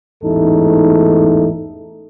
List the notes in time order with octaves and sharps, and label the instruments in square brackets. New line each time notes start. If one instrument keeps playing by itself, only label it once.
[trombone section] A1 E2 G#2 A3 D#4 A4